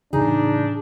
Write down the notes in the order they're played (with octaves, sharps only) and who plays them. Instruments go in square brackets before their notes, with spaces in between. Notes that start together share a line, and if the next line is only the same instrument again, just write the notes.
[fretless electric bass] A2 C#3 E3 [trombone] D4 [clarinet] D#4 [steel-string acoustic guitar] G#4